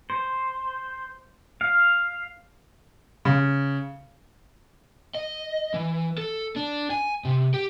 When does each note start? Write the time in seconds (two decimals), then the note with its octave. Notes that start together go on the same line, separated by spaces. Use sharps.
0.10 C5
1.61 F5
3.25 C#3
5.15 D#5
5.74 E3
6.18 A4
6.56 D4
6.91 G#5
7.25 C3
7.54 G4